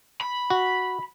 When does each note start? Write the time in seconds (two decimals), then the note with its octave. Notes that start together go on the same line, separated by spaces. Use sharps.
0.21 B5
0.50 F#4